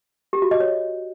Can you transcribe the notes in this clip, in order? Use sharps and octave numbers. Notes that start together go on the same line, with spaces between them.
G4
F#4
D#5
C#5